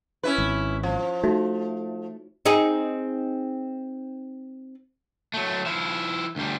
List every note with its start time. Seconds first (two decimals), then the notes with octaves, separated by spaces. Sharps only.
0.23 C#4 E4 B4
0.38 G#1
0.83 F3
1.24 A3 D#4 F#4 E5
2.46 C4 D#4 G#4
5.34 F#3 A3
5.66 F3 E4
6.36 D2 G3